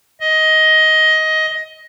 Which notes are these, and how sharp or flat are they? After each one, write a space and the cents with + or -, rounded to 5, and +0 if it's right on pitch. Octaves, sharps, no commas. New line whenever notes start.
D#5 +15